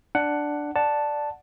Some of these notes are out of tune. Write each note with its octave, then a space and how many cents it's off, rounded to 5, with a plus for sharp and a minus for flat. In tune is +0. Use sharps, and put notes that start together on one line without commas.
D4 +0 F#5 +5
D5 +0 F#5 +0 A5 +0